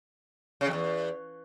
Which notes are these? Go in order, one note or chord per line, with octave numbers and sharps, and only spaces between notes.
C#3
F2
E2